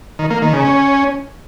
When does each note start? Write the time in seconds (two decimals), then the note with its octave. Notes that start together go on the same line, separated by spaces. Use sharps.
0.19 D#3
0.30 A#3
0.42 D#3
0.53 C#3
0.65 C#4